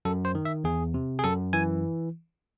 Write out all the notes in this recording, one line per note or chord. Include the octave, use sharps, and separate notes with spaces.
F#2 A4
C5
D#3
E5
E2 G#4
C3
G#4
F#2 A4
E3 G#5